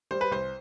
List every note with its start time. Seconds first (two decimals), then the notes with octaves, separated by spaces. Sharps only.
0.11 G3 C5
0.21 B4
0.31 C2 C5